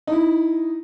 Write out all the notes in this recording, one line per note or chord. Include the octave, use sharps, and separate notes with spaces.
D#4 E4